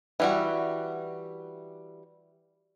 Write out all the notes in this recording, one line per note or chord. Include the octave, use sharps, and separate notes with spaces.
E3 G3 F#4